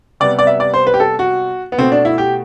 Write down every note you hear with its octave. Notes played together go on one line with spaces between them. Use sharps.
C3 G3 B3 D5
D5
E5
D5
C5
B4
G4
A4
F#4
B3
B2 A3 C4
D4
E4
G4